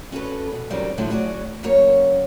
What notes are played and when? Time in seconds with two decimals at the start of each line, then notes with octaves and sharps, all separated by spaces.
0.12 C#4 F#4 A4 B4
0.52 B2
0.70 F2 D#3 F#3 G3 C#4
0.98 A2 D3 F3 F#3 E4
1.10 F#3 F#4 G#4 C#5 D5
1.63 F#2 C#3 F#3 A#3 C#5